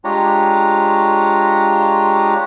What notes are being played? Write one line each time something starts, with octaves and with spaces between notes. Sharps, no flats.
G#3 D4 F4 G4 C#5 A#5